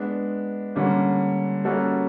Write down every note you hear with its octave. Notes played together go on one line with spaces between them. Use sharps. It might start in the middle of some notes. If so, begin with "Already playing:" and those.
Already playing: G#3 B3 D4
D3 G3 A#3 C#4
G3 A#3 C#4 F#4 A4